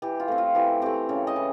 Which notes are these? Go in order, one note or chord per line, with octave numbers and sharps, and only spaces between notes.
E3 G4
F4
A3 C4
F4
E3 G4
A3 C4 G4
C#3 C#5
D#5
E3